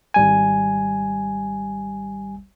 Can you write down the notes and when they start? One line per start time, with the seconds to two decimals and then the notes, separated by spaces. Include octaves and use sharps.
0.14 G#1 G3 G#5